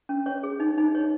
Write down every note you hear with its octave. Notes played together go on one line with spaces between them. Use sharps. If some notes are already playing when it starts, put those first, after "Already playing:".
C#4
C#5
G#4
D#4
D#4
C#5